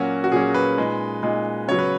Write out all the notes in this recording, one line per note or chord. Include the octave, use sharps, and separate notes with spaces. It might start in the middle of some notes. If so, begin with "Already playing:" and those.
Already playing: A#2 F#3 A#3 C#4 F#4
F#4
A#2 F#3 A#3 C#4 G#4
B4
A#2 G#3 D#4
A#2 G#3 D#4
C#3 F#3 B3 C#5
B4